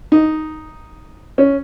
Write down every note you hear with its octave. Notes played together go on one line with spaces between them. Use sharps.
D#4
C#4